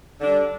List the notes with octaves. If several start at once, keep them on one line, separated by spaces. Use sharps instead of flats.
D3 G3 D4